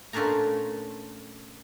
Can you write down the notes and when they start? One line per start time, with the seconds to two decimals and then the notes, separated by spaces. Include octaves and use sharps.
0.13 A#2 A3 C#4 D4 G#5 A#5